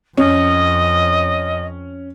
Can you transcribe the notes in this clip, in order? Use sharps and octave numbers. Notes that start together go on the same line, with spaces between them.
F2 C#4 D#5